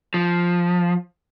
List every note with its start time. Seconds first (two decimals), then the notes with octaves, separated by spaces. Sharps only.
0.14 F3